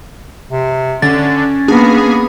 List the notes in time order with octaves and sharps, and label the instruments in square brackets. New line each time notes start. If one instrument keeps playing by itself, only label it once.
[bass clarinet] C3
[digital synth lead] D3 [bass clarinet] C#4 [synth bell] A6
[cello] A#3 B3 [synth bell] D4 [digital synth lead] G#4